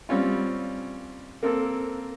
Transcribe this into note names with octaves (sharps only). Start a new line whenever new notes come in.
G3 C4 C#4 F4
A#3 C4 A4